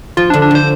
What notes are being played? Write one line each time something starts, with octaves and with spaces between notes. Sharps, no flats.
F3 F4
D4
D3
D4
D3 C5